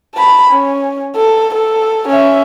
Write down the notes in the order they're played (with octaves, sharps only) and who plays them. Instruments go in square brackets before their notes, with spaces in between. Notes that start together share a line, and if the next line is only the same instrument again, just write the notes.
[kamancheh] A5 B5
C#4
A4
A4
C#4 E5